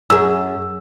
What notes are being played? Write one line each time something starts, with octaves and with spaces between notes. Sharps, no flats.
F#2 G#4 E6